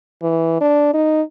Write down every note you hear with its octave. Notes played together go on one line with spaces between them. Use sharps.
E3
D4
D#4